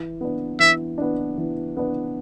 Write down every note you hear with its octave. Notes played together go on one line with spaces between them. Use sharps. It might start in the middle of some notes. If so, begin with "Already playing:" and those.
Already playing: E3
B3 D4
E3 E5
B3 D4
E3
B3 D4